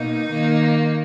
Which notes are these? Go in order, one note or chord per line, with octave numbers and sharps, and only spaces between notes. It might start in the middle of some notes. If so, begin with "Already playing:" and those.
Already playing: B2 A#3 D#4
D#3 A#3